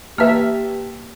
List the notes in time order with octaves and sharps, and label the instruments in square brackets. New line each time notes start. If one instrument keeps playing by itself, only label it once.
[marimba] A#3 B4 [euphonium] G4 [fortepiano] E5 A5 F6